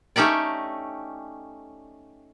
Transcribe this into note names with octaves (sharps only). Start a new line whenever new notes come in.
A3 C#4 D#4 G4 D5